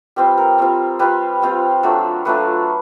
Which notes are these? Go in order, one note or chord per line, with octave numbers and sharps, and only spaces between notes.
G3 C4 F4 B4
A#4
G3 C4 F4
G3 C4 F4 B4
G3 C4 F4
F#3 A3 D4 F4
F#3 A3 D4 F4 B4